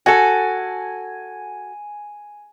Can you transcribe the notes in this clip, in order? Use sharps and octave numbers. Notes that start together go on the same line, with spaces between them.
F#4 A4 G#5